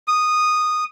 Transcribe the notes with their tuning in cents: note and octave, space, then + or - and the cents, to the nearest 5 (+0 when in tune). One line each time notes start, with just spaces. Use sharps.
D#6 -10